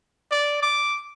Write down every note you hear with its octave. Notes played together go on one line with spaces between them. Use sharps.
D5
D6